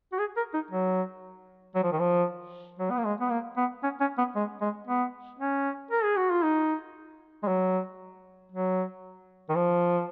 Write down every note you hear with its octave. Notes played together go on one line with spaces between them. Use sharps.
F#4
G#4
A#4
D#4
F#3
F#3
F3
D#3
F3
F#3
B3
A#3
G#3
B3
A#3
B3
C#4
C#4
B3
G#3
G#3
B3
C#4
A#4
G#4
F#4
F4
D#4
G#3
F#3
F#3
D#3
F3